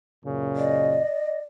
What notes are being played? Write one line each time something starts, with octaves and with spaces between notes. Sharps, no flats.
F#2 A#2 C#3
D5 D#5